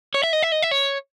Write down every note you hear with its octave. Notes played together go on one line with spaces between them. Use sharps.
C#5
E5
D#5
E5
D#5
E5
C#5